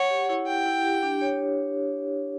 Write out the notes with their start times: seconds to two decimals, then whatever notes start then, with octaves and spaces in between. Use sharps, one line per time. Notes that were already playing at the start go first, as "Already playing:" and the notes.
Already playing: C#5 F#5
0.10 G4
0.29 E4
0.47 F#5 G5
0.66 E4
0.85 G4
1.03 D4
1.21 C#5